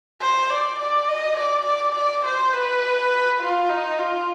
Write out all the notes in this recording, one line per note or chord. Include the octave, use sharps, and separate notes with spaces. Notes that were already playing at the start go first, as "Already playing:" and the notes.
C5
D5
D5
D#5
D5
D5
D5
C5
B4
F4
D#4
F4